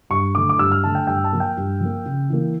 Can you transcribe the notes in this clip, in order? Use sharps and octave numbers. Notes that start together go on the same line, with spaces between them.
G2 C#6
D3 A3 D6
D6
G2 E6
F6
D3 A3 A5
G5
G2 G5
A5
F3 A#3
G5
G2
F3 A#3
C#3
E3 A#3